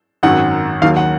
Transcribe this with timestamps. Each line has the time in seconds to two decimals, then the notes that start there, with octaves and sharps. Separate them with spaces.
0.23 G#1 F#2 D#3 F#3 F#5
0.82 D#2 D#3 F#3 F5
0.97 F#5